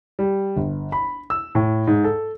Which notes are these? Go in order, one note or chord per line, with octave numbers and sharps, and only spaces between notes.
G3
G1
B5
E6
A2
G#2
A4